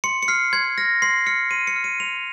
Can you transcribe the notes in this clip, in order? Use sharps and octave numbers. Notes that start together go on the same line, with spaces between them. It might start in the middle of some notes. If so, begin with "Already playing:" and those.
C6 C#7
C#7
F6 C7
C6 G#6
F6 A#6
C6 C7
F6 C#7
C6 D#7
C#7
F6
D#7
C6 F7